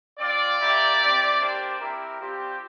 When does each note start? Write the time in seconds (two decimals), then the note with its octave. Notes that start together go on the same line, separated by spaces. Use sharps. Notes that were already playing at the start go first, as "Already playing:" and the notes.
0.20 C4 F4 D5
0.60 A#3 E4 G4
1.00 C4 E4 G4
1.40 A#3 D4 G4 C5
1.79 C4 E4 G4 A#4
2.19 G3 C4 F4 G4